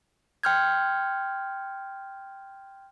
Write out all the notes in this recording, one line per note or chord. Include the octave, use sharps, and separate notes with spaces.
G5 C6 F6 G6 G#6